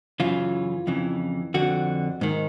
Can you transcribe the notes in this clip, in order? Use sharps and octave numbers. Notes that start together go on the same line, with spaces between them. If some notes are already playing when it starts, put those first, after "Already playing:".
F#2 C#3 E3 F4
F2 C#3 E3
F2 D3 F#4
G#2 D#3